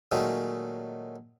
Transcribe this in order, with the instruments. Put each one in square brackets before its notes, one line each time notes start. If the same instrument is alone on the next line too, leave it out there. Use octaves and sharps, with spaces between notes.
[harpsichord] A#2 D#3 F#3 G#3 A3 C#4